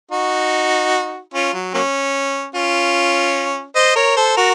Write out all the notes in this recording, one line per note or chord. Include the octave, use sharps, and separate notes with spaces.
D#4 F#4
C#4 F4
F#3
F#3 A#3 C#4
C#4 F4
C5 D#5
A#4 C#5
A4 C5
F#4 A#4